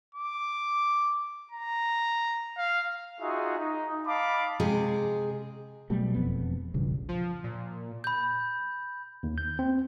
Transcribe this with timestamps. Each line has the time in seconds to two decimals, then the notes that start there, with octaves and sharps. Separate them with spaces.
0.15 D6
1.51 A#5
2.57 F5
3.21 D#4 F4 F#4 G#4 E5
3.59 D#4
4.06 D#5 F5 A5 B5 D6
4.60 C3 G#3 G#4
5.90 B2 F#3 G3 A3
6.15 E1 F2 B3
6.74 E1 A#1 G2 C#3
7.09 F3
7.44 A#2
8.04 B5 G6
9.23 D#2
9.38 G6
9.59 C4